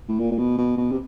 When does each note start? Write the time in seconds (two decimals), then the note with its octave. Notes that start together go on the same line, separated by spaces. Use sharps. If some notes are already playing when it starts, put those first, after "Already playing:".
0.09 A2
0.19 A#2
0.32 A#2
0.39 B2
0.58 B2
0.77 B2
0.92 C3